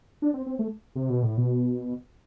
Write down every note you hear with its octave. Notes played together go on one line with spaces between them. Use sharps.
D4
C4
C4
A3
C3
B2
A2
B2